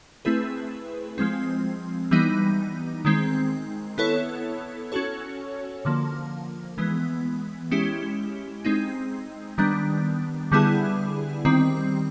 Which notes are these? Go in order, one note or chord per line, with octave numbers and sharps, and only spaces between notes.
A3 C4 E4 G#4 B4
F3 G#3 C4
E3 G3 B3 D#4
D#3 G#3 C4
B3 E4 A4 C#5
C#4 F#4 A4 C#5
D3 F3 A#3
E3 G#3 B3
G#3 C#4 E4 G4
G#3 C4 D#4
D#3 G3 B3 D4
D3 G3 B3 E4 G#4
D#3 G3 C4